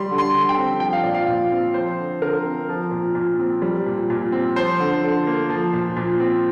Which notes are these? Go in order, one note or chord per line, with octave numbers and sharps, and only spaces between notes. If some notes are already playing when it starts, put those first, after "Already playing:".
Already playing: G3 C6
D3
C6
D3
G5
C4
F3 G5
F5
A#2 D5
F5
A#2
C4
F3 C5
D3
D3 A#4
C4
F3
A#2
A#2
C4
G3
A#2
A#2
C4
F3 C5
D3
D3
A#3
F3
A#2
A#2
C4